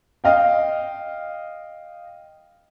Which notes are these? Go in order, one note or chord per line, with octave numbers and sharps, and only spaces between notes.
D#5 F5 G5